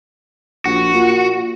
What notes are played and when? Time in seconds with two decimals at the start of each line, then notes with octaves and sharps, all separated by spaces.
0.66 A#1 F#4
0.94 A#2